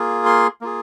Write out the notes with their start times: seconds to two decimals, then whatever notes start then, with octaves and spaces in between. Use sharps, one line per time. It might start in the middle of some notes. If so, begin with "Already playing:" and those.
Already playing: A#3 F4 G#4
0.26 C6
0.61 A#3 F4 G#4